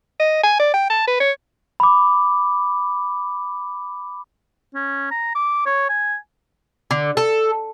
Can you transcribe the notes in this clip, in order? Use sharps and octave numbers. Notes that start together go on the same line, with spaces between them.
D#5
G#5
D5
G5
A5
B4
C#5
B5 D6
C#4
A#5
D6
C#5
G#5
D3
A4